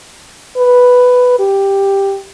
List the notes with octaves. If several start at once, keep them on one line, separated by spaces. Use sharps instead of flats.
B4
G4